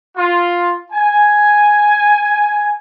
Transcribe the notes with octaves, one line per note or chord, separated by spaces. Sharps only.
F4
G#5